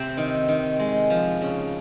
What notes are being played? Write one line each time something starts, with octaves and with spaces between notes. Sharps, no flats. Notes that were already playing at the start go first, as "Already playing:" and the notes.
Already playing: C3 C4 C5
D#3
D#3
G#3
F3
C#3